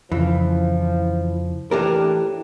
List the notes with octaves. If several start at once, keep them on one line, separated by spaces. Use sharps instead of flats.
F2 C#3 E3 F3
A2 E3 D4 G4 A#4